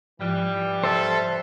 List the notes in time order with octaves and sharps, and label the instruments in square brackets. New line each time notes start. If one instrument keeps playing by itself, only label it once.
[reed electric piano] G#2 F3 [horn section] E3 G3
[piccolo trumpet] A4 [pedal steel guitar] C5 E5 A5